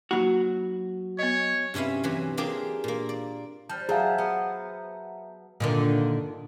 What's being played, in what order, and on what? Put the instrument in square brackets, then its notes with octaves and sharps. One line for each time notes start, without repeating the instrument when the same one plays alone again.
[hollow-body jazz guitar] F#3 F#4 [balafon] A#3 D#4
[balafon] B3 D#5 [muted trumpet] C#5
[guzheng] G2 C3 C#4 E4 F5
C3 E3 F#3
A#3 D4 F4 G4 G#4 C5
A#2 A#3
D5
[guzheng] G3 [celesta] C5 F6 G6 [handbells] A5
[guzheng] F#3 [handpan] G#4 F5 [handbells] E5 A5 A#5
[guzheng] B3
[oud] A#2 D3 D#3